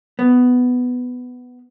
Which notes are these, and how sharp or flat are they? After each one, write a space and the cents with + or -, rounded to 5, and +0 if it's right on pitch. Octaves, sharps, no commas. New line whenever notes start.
B3 +10